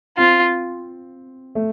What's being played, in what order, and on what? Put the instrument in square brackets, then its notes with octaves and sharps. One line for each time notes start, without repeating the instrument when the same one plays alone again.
[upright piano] C4 [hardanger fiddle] F4
[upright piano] A3